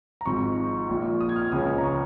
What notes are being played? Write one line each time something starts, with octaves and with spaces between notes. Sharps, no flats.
A#5
G#1 G#2 F3 C#6
A#1 A#2 F3
D#6
G#6
F6
C#2 C#3 F3 G#3 C#4 D#6
A#5
C#6